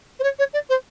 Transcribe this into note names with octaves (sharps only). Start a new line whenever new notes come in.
C5
C#5
C#5
D5
C5